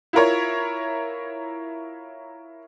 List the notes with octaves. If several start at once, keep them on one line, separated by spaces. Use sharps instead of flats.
E4 F4 A#4 C#5